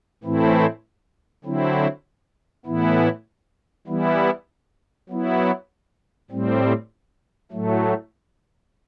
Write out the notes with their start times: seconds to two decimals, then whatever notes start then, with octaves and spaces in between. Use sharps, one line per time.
0.24 A2 E3 A3 C4 E4
1.44 D3 F#3 C4 E4
2.66 A2 E3 B3 E4
3.87 E3 G3 B3 E4
5.09 F#3 B3 E4
6.31 A2 G3 C4
7.52 A2 F#3 A3